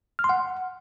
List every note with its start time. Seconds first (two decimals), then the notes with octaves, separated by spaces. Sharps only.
0.19 F6
0.24 C6
0.29 F#5